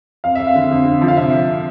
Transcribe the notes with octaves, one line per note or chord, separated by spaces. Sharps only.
F2 F5
F2 E5
F5
D3
F2
D3
F3
F5
C3 E5